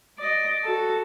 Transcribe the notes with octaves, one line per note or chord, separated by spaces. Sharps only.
D5 D#5
F#4 A4